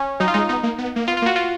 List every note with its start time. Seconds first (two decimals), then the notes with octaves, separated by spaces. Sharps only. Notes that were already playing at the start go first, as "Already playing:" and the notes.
Already playing: C#4
0.20 F#3 D#4
0.28 F4
0.34 G#3 D#4
0.49 B3 D#4
0.63 A#3
0.78 B3
0.96 A#3
1.07 B3 F4
1.17 F4
1.22 A#3
1.26 F#4
1.36 F4